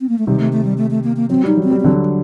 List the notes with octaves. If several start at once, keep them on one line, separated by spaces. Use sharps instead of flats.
C4
A#3
A3
C3 D#3 G3
A3
A3
G3
A3
A3
A#3
A#3
F#3 C4
G3 D#4
F#3
C4
G3
D3 F#3 C4